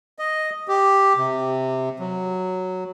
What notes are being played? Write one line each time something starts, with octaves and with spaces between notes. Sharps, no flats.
D#5
G4
C3
F#3